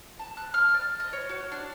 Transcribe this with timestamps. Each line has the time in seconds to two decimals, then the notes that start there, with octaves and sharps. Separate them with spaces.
0.20 A5
0.37 F#6
0.54 F6
0.74 D5
1.00 D#5
1.13 C#5
1.29 F#4
1.52 D4